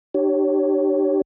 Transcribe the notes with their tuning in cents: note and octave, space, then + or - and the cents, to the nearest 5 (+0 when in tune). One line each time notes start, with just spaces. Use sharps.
D4 +40 G4 -20 C#5 +0